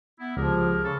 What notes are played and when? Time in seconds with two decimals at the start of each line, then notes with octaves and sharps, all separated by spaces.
0.20 B3 E4
0.37 C#2 F3 G4 G#4 A#4
0.84 C#3 A4